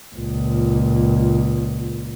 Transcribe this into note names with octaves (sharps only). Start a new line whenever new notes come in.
C#2 A#2